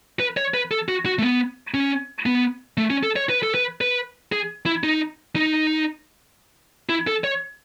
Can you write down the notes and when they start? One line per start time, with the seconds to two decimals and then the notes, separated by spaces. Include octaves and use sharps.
0.20 B4
0.37 C#5
0.54 B4
0.71 A4
0.88 F#4
1.06 F#4
1.19 A3
1.22 B3
1.74 C#4
2.26 B3
2.77 A3
2.90 C#4
3.03 A4
3.16 C#5
3.29 B4
3.43 A4
3.54 B4
3.81 B4
4.32 G#4
4.66 E4
4.83 D#4
5.36 D#4
6.89 E4
7.07 A4
7.24 C#5